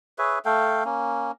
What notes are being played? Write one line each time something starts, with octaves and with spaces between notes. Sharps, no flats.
G#4 B4 C#5 E5
A3 A4 F5 G5
A#3 C#4